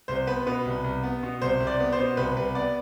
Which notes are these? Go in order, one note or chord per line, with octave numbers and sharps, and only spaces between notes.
C2 C5
B3 B4
B2 B4
C2
C2
B3
B2
C2 C5
C2
D5
B3
C5
B2
C2 B4
C2 B4
B3 D5